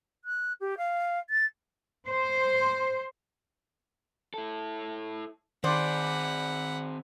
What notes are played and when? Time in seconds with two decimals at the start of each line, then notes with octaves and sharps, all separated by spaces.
0.24 F#6
0.60 G4
0.77 F5
1.29 A6
2.06 C5
4.34 E4 A4
5.64 D#3 C4 G#4 C5 D5 F#5 B5